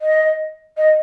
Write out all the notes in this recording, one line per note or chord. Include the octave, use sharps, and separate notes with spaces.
D#5
D#5